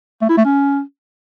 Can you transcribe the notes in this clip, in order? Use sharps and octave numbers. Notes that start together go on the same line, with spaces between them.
A3
E4
A3
C#4